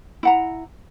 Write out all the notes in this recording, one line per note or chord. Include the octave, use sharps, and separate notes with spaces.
E4 F#5 A#5